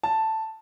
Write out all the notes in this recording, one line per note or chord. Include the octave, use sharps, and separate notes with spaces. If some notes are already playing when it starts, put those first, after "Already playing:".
A5